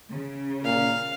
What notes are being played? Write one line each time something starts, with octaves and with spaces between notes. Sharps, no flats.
C#3
A#2 F5